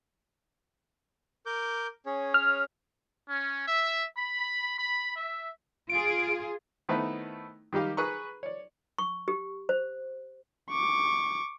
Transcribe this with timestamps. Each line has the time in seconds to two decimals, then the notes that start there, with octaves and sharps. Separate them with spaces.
1.46 A#4 D6 G6
2.06 C#4 G#4 C#5
2.34 F6
3.28 C#4
3.67 E5
4.17 B5
4.77 B5
5.16 E5
5.89 F4 G#4 D7
6.89 D#3 A3 B3 C4 D#4 E4
7.73 D#3 G3 D#4 G4 F5
7.97 G#4 B4 A#5 B5 C#6
8.43 C#5 D5
8.98 C#6
9.28 G4
9.69 C5
10.70 C#6 D6